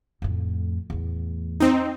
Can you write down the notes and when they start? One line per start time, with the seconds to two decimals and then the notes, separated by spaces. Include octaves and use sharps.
0.22 F2 A2
0.90 E2 A2
1.60 C4 D#4